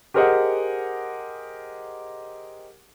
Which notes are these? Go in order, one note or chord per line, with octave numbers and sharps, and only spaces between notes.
G4 G#4 A#4 C5 D#5 F#5